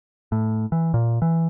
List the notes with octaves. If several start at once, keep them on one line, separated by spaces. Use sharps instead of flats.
A2
E3
A#2
E3